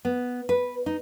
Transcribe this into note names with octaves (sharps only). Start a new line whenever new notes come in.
B3
B4
D#4